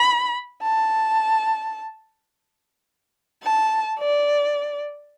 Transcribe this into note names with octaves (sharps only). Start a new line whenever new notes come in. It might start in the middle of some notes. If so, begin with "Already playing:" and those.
Already playing: B5
A5
A5
D5